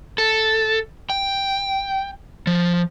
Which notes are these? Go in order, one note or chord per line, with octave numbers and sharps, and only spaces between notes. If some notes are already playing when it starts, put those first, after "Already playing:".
A4
G5
F3